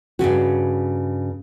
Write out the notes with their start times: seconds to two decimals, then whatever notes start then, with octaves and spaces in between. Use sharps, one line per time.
0.19 G2 A#2 C#3 F#4